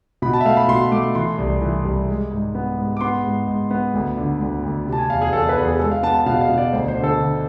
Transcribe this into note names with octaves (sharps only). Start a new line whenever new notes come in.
B2 B5
A5
E5
A3 F5
B5
B2 C6
A3 D6
E3 C6
C2
E3
C2
G#3
G#2
B3
G#2
D6
B3 C6
G#2
G#2
B3
D2
D3
D2
D2
C3
A5
G#5
E2 F5
G#4
E2 A4
B4
E2
G#4
G#3 A4
F5
B3 A5
A5
B2 F5
F5
B2
D5
D2 C5
C5
D3
A4
D3